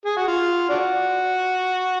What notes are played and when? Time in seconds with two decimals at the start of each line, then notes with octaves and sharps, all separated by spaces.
0.05 G#4
0.17 F#4
0.28 F4
0.69 D4 F#4